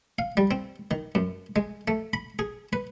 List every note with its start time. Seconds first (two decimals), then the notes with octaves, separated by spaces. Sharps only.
0.19 F5
0.37 G3
0.51 C4
0.91 D#3
1.15 F#2
1.56 G#3
1.88 A3
2.13 B5
2.39 G#4
2.73 B4